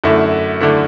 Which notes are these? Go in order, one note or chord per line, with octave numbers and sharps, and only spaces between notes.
F#2 D3 A3 E4
D3 A3 E4